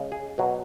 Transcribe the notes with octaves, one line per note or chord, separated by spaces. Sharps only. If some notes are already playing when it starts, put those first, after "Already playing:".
Already playing: C#3 G#3
G#4
B2 F#3